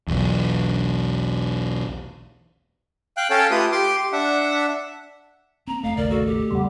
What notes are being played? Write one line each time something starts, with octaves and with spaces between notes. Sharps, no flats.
B1 E2
F5 G5 F#6
C#4 A4 C#5 F5 G5 A5
A3 F4 G4 B4 D#6
G4 C6 D6
D4 E5 F#5
A#3 C4 A#5
F1 A3 F5
A1 D#2 C#3 A#4 D5
F#4 A4
G4
E2 C#3 G3 B3 F#5 C6